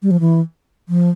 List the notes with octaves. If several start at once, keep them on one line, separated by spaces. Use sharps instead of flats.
G3
F3
E3
F3